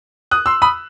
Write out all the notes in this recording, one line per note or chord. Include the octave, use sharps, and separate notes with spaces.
D#6 F#6
C6 E6
B5 D#6